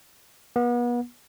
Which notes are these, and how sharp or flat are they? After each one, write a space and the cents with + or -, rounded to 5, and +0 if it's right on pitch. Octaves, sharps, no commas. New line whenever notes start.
B3 -35